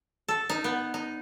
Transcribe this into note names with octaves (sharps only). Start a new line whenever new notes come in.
A4
D#4
B3
D#4